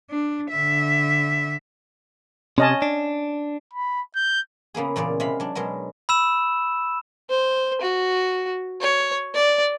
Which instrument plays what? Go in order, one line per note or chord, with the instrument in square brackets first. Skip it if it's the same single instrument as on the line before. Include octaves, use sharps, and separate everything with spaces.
[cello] D4
D3 E5
[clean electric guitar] C3 [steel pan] C#4 D#5 A5
[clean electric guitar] D4
[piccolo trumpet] B5
G6
[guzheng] C#3 A#3 B3 G#4
E2 A#2 C#3 D5
C3 G#3 F5 B5
F#3 D4
B2 F#3 G#3 A#4
[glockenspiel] B5 E6 E7
[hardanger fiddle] C5
F#4
C#5
D5